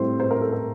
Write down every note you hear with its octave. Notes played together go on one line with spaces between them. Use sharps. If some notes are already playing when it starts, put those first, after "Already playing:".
Already playing: A2 G3 C4 C5
C5
A#4
A4
A#4